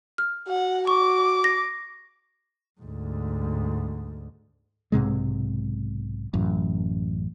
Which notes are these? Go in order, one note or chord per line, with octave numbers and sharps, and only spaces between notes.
F6
F#4 F#5
C#6 D6
A#6
D2 G#2
B1 G#2 C3 G#3
A1 F#2